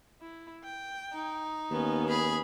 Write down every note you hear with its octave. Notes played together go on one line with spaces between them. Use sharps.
E4
G5
D#4
D#2 B3 C#4
G#4 B5